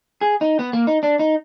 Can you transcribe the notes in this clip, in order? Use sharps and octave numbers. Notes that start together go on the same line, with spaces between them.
G#4
D#4
B3
A#3
D#4
D4
D#4